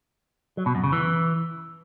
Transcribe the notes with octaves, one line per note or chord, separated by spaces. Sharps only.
F#3
B2
F#2
C#3
E3